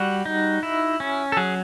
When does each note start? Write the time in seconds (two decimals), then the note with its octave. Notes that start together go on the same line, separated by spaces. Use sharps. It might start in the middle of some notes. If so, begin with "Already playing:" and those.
Already playing: G3 F#4
0.25 D#4
0.63 E4
1.00 C#4
1.32 A4
1.37 F#3 G#4